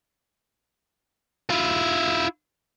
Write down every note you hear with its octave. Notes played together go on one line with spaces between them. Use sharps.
E4 F4